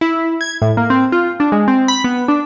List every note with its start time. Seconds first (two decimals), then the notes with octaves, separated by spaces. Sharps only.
0.01 E4
0.41 G#6
0.62 A2
0.77 A#3
0.90 C4
1.12 F4
1.40 D4
1.52 G#3
1.68 C4
1.88 B5
2.04 B3
2.28 D4